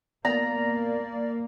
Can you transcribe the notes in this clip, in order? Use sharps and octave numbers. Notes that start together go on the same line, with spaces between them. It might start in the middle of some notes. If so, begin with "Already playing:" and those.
A#3 B3 D5 A#5